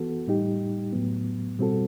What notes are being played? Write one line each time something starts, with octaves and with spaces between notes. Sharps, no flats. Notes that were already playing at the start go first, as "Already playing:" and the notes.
Already playing: E3 B3 F#4 A4
A2 G3 D#4 G4
A2 F#3 B3
B2 G3 C4 F#4 A4